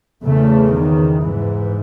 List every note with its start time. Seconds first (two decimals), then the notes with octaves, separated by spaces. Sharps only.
0.24 E2 C#3 A3
0.73 D#3
1.21 G#2 E3